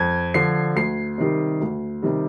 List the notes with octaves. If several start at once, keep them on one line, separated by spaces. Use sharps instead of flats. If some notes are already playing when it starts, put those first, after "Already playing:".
Already playing: F2 G#6
D3 F3 C7
D2 C7
C3 D#3 G3
D2
C3 D#3 G3